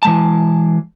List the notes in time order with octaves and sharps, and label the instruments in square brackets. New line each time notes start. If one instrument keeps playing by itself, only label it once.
[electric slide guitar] E3 G#3 A5